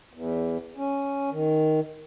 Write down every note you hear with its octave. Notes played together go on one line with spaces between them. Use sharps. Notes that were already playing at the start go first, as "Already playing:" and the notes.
E2
C#4
D#3